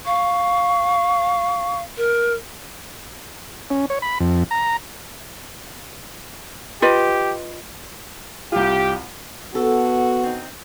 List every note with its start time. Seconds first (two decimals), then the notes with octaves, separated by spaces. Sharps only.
0.06 F5 C#6
1.97 A#4
3.70 C#4
3.90 C#5
4.02 B5
4.20 F2
4.51 A#5
6.82 F4 G4 B4 D#5
8.52 C2 F4 G4
9.55 B3 F#4 A4
10.23 C4 D#4